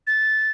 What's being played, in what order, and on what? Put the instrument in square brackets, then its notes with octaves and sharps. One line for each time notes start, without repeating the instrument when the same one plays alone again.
[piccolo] A6